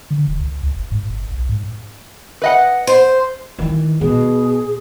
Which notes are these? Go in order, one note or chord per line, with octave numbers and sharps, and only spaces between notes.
D3
E1
C#2
C#2
F#1
G#2
G1
B1
G#2
B4 D#5 F#5
C5
D#3 E3
B2 G#4